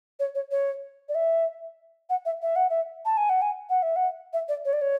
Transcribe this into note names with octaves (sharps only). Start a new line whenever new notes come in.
C#5
C#5
C#5
D5
E5
F#5
E5
E5
F#5
E5
A5
G#5
F#5
G#5
F#5
E5
F#5
E5
D5
C#5
D5
C#5